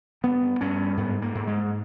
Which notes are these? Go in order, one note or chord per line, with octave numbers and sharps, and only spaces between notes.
G2 B3
G2 C#4
G#2 B3
A#3
G#2
G#3